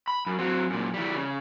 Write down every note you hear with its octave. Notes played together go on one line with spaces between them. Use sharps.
B5
F#2
F#3 C4
F#2 A#2
E3 G3
C#3